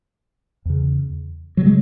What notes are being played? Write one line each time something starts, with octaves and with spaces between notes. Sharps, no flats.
E2 C#3
C#3 F#3
G#3